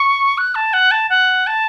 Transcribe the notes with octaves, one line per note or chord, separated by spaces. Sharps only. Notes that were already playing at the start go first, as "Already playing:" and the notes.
Already playing: C#6
F#6
A5
F#5
A5
F#5
A5